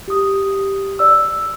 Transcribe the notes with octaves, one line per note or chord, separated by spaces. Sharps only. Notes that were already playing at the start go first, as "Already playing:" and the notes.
G4 D#6
D5 E6